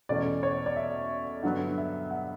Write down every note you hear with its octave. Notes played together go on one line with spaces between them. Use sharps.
E2 B2 A3 C#4 D5
C#5
D5
E5
G2 D3 F#3 B3 F#5
E5
F#5